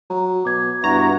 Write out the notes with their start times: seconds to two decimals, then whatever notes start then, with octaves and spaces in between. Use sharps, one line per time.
0.10 F#3 A#5
0.45 B2 D6 G#6
0.84 G2 B3 E4 F#4 A#5 C#6